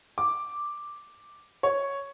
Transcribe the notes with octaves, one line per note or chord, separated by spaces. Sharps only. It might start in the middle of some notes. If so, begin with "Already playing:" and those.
D6
C#5